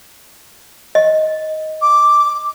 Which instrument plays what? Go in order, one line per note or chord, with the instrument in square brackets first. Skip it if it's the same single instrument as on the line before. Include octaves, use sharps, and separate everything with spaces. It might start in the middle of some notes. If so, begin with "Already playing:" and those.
[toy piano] D#5
[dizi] D6